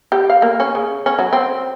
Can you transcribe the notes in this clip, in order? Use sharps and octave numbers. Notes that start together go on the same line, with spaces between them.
G4
F5
A#3
C#4
C#3
C#4
F#3
C4